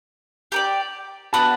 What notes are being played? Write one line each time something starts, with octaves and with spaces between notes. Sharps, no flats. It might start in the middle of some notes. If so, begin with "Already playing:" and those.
G4 A#4 D5
B3 D4 F#4 B4 A5 B5